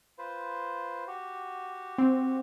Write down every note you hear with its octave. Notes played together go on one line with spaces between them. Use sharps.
F4 B4 C5
F#4 G4
C4